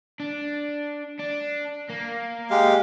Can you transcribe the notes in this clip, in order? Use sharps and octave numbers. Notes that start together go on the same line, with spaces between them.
D4
D4
A#3
G#3 G4 F5